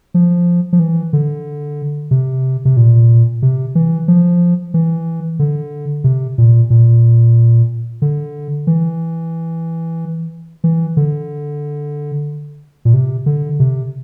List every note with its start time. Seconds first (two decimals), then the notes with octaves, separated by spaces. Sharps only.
0.14 F3
0.73 F3
0.80 E3
1.13 D3
2.11 C3
2.65 C3
2.77 A#2
3.42 C3
3.75 E3
4.08 F3
4.74 E3
5.39 D3
6.04 C3
6.38 A#2
6.70 A#2
8.02 D3
8.67 E3
10.64 E3
10.97 D3
12.85 A#2
12.94 C3
13.26 D3
13.60 C3